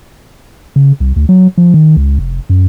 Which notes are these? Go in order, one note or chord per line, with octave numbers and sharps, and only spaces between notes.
C#3
C2
D2
F#3
F3
D#3
C#2
F1
F#2